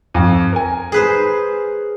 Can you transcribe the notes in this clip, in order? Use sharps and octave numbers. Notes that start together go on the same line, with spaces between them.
F2
A#4 G#5
G#4 B4 C5